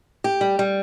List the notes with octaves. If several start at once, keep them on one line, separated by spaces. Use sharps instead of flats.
G4
G3
G3